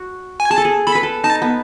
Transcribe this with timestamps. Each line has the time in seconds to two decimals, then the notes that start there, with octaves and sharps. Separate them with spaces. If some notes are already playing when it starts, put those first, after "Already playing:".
Already playing: F#4
0.40 G#5
0.50 G#4 A5
0.58 A4
0.65 G#4
0.87 A4 B5
0.95 B4
1.03 A4
1.24 D#4 A5
1.42 B3